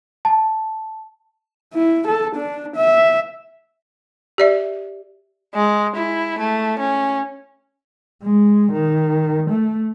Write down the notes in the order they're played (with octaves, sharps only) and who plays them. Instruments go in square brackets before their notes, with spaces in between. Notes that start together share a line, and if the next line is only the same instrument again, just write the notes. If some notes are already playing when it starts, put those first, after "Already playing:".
[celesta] A5
[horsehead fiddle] E4
A4
D4
E5
[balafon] G4 D5 E5
[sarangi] G#3
E4
A3
C#4
[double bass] G#3
D#3
A3